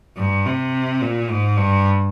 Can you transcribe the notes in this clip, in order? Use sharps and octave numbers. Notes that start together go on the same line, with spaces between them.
G2
C3
A#2
G#2
G2